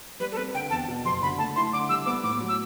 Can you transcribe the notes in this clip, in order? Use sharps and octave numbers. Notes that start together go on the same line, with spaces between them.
G3 B4
A4
C4 B4
D3 G5
E2 A5
B2
F#1 C6
D3 B5
A3 A5
E4 C6
D3 D6
G3 E6
B3 D6
A2 D6
F#3
E6